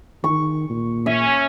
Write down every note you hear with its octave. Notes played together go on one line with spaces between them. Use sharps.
D#3 C#6
A#2
C#4 E5